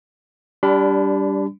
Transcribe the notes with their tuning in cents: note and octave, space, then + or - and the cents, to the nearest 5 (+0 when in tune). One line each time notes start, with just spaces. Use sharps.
G3 +0 D4 -20 B5 +40